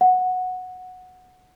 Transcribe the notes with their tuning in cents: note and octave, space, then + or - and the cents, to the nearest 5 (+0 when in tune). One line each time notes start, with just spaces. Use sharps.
F#5 -10